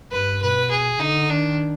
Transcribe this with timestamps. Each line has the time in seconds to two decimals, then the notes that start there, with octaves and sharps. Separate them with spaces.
0.11 G2 B4
0.41 B2 B4
0.70 G#4
1.00 D3 D#4
1.30 D#3 D4